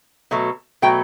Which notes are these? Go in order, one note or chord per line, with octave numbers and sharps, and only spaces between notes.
B2 F#3 A3
B2 F#3 A3 G5